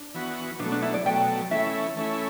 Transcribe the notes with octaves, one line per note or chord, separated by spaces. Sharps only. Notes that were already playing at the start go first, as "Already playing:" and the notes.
Already playing: D4
E3 B3 F#4
B2 F#3 A3 D4
D4
E4
D5
B2 F#3 A3 G5
E3 A3 C#4 E4 E5
E3 A3 C#4 E4